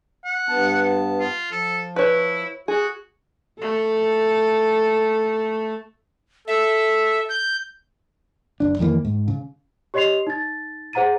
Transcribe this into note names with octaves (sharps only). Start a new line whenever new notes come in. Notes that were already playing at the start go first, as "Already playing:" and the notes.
F#5
G2 B3 A5
F4
F3 A4
E4 B4 C#5
F#4 G#4
A3 A4
A4 E5
G6
F#1 D4
F2 D#3 E3 A#3
G#2
C#3
G4 C#5 D#5 C6 C7 F7
D#4 A6
G#4 C5 F#5 A#5 A6 D#7